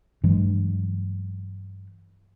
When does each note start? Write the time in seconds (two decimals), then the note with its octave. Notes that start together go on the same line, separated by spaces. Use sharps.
0.24 G2 E3 F#3 G#3